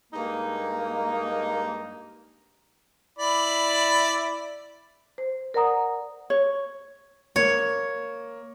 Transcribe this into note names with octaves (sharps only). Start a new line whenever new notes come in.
G2 G#3 A#3 D#4
E4 D5 B5
C5
A#4 D5 F#5 A#5 D#6
C#5
A#3 C#5